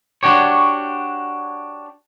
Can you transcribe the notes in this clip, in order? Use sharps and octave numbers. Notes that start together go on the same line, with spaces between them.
D4 F#4 G4 C#5